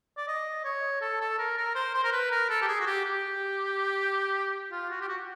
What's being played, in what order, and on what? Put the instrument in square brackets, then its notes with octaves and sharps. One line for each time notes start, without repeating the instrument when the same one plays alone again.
[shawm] D5
D#5
C#5
A4
A4
A#4
A#4
C5
C5
A#4
B4
A#4
A4
G4
G#4
F#4
G4
G4
F4
F#4
G4
F#4